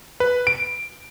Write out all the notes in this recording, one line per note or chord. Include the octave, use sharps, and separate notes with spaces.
B4
D7